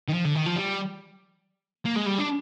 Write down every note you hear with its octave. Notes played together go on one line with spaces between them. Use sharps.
D#3
F3
D3
D#3
F3
G3
A#3
G#3
G3
D4